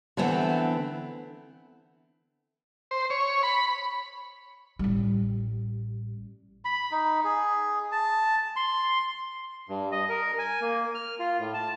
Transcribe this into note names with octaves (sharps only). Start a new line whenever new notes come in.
D3 E3 A3 B3 C4
C5
C#5
B5
A1 G3
B5
D#4
G#4
A5
C6
G2
D#5
A#4
G#5
A#3
F6
F4
A2
A5